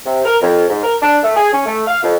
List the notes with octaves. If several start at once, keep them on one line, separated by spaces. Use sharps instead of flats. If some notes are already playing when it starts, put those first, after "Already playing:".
C3
A#4
F2
G#2
A#4
D4
A3
G#4
C#4
A3
F5
F2